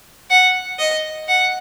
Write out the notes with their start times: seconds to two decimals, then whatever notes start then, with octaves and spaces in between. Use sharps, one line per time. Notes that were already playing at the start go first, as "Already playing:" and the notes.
0.30 F#5
0.79 D#5
1.28 F#5